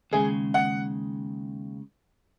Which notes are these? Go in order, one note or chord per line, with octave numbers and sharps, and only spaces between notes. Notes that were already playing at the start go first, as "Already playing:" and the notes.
D#2 C#3 G#3 G#4
F#5